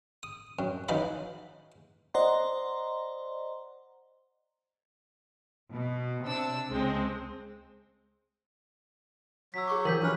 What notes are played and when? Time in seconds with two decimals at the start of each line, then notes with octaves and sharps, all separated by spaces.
0.23 D#6
0.59 F#2
0.89 E3 F#3 D#4 F5 B5
2.14 C5 D5 D#5 F#5 A#5 C6
5.71 B2
6.24 C3 D4 E6
6.70 C#2 G#3 C4
9.54 F#3 E6 B6
9.67 G#4 C#6 D6
9.85 E3 F3 G4 A#4 G6 B6 F#7
10.03 F3 C#4 D4 B4 F6